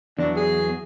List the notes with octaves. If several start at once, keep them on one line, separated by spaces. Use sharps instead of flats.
E2 F#3 D4
G#4